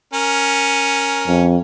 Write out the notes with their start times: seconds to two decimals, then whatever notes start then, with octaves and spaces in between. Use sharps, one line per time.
0.13 C#4 A#4
1.27 F2